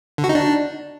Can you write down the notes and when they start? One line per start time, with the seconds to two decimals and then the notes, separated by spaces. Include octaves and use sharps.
0.18 D3
0.24 F#4
0.29 D#4
0.35 D4